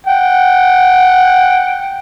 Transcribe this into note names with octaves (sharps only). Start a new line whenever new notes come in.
F#5 G5